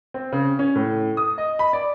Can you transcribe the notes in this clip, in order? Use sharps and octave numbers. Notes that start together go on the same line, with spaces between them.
C4
C#3
C#4
A2
D#6
D#5
B5
D5